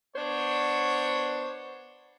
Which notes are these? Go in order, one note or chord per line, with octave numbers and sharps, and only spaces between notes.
B3 D4 C5 C#5